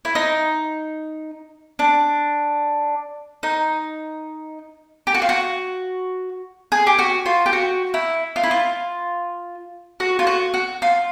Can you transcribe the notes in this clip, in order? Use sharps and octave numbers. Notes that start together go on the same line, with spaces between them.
E4
D#4
D4
D#4
G4
F#4
F4
F#4
G#4
G4
F#4
F4
G4
F#4
E4
F4
E4
F4
F#4
F4
F#4
F#4
F4